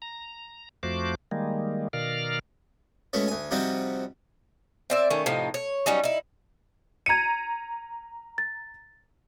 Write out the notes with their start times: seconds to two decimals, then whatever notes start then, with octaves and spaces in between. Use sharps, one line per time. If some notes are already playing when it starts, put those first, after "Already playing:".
0.02 A#5
0.83 F2 F3 A3 F#4 C5 D6
1.31 D#3 G3 G#3 A#3
1.93 B2 D#3 A#4 D5 F5 F6
3.13 B2 G#3 A3 C#4
3.28 D2 G#5
3.51 C3 F3 G3 C4 D#4 F#4
4.90 C4 D5 E5
5.10 D#3 A3 C#4
5.26 A2 C3 F3 D#4
5.54 C#5
5.86 F#3 G3 C#4 D#4
6.04 D#4 E4
7.06 A#5 G#6 C#7 D#7
8.38 A6